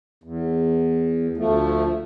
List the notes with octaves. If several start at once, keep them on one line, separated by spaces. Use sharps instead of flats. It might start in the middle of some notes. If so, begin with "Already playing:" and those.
E2
D2 F3 A3